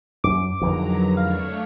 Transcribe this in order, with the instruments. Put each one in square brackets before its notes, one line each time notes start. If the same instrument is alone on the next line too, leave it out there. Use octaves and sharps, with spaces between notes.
[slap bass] F#2 [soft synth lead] D6
[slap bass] F2 D3 D#3 [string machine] F#3 A#5 [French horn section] E4 G#4 B4
[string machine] A3 D4 C#5 [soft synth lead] F5